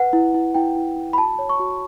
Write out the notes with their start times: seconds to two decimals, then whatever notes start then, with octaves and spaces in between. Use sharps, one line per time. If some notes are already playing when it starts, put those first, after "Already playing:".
Already playing: B4 F#5
0.13 E4
0.34 E4
0.54 E4 G5
0.76 E4
0.96 E4
1.13 B5
1.18 F#4 A5
1.39 C#5
1.49 C#6
1.59 F#4